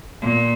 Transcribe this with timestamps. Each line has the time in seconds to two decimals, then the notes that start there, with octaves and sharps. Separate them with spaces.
0.22 A#2